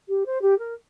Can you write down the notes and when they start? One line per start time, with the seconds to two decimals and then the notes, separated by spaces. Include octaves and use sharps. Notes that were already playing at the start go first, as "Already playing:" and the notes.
0.09 G4
0.26 C5
0.42 G4
0.59 A#4